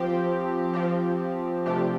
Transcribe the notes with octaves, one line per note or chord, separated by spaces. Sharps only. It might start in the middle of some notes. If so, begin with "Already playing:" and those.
Already playing: F3 C4 G4
F3 C4 G4
C3 F3 A3 D4 G4